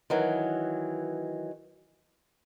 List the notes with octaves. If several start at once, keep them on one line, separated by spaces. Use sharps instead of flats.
D#3 E3 F#3